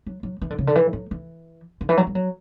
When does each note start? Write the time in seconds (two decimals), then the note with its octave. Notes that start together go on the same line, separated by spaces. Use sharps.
0.06 F#3
0.23 F#3
0.41 E3
0.50 D3
0.58 C#3
0.67 D3
0.75 E3
0.93 F#3
1.11 E3
1.81 D3
1.89 E3
1.97 F#3
2.07 G3
2.15 F#3